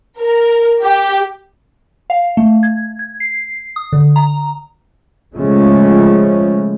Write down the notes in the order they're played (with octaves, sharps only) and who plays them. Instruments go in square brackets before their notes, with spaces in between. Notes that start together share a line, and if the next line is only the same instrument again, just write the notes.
[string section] A#4
G4
[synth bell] F5
A3
G#6
G#6
C7
D#6
D3
A#5
[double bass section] C#3 F3 G#3 A3